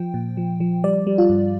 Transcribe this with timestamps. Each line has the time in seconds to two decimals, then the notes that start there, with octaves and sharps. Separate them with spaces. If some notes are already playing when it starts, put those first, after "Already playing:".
Already playing: F3 G5
0.14 A#2
0.37 F3
0.60 F3
0.84 G3 D5
1.07 G3
1.18 F4
1.29 G2